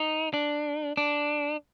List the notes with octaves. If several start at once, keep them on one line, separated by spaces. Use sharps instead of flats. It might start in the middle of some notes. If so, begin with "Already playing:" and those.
Already playing: D#4
D4
D4